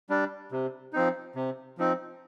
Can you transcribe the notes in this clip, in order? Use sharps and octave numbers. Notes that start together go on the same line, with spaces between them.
G3 D4
C3
F3 C4 D#4
C3
F3 C4 D#4